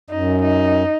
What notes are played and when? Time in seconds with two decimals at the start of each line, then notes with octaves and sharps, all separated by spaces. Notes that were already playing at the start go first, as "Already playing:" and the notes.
0.10 F#2 D#4
0.42 D#4